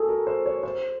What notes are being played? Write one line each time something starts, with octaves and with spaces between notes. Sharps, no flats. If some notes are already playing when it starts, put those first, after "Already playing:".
Already playing: F#4 G#4 A4
A#4
C5
C#5
C5